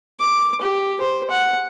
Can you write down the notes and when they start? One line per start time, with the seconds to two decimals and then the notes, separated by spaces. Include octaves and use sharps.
0.20 D6
0.61 G4
1.01 C5
1.30 F#5